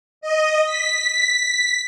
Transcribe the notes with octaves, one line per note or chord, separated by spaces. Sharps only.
D#5
B6